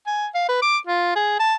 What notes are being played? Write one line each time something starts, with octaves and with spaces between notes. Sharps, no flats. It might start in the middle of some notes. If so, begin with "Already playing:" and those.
G#5
F5
B4
D6
F4
G#4
A5